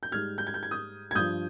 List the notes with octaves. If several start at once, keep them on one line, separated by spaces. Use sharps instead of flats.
G6
G#2 G3 F6 G#6
G6
G#6
G6
G#6
D#6 G6
G#6
G2 F3 D#6 G6